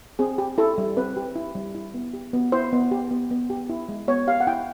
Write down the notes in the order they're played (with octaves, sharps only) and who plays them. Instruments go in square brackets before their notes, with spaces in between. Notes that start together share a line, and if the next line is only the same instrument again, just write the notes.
[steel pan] C4 G#4
G4
E4 A4
G3
C4 B4
G4
E4
G3
E4
B3
G4
B3
E4 C5
B3
G4
B3
B3
G4
E4
G#3
B3 C#5
G4 F5
F#5
E4 G5